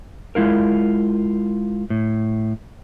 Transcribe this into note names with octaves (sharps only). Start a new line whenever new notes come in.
G#3 E4 F4 A#4
A2